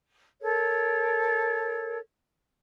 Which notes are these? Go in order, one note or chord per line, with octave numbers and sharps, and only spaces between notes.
A4 A#4 C#5